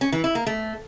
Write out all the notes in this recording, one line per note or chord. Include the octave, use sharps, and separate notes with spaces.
C#4
E3
E4
A#3
A3